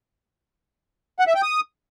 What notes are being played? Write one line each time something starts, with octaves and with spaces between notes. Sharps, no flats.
F#5
E5
G5
D#6